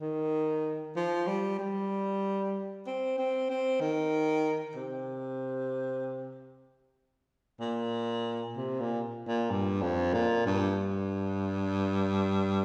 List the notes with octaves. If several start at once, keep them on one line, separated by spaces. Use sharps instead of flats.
D#3
F3
G3
G3
C4
C4
C4
D#3
C3
A#2
C3
A#2
A#2
G2
F2
A#2
G2